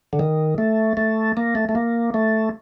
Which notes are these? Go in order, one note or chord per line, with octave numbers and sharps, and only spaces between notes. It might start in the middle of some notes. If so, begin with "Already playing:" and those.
D3
D#3
A3
A3
A#3
A3
A3
A#3
A3